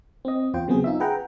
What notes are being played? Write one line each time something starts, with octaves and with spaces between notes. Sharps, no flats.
C4 D#5
E2 F4 C5 G5
C#3 F#3 B3 C4 G#4
D#4 F4 E5
G#4 B4 F#5 G5 A#5